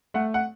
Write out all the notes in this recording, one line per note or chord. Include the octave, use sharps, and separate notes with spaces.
A3 F#5
F#5